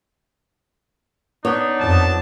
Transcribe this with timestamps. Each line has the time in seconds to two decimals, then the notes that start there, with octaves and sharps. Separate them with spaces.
1.45 B3 D4 D#4 C#5
1.80 F2 A5